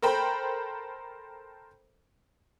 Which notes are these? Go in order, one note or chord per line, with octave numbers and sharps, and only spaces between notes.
A4 A#4 C5 G5 B5